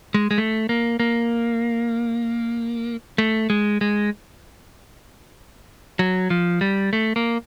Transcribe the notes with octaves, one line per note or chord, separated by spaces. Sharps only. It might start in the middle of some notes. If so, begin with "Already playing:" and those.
G#3
G#3
A3
A#3
A#3
A3
G#3
G#3
F#3
F3
G3
A3
A#3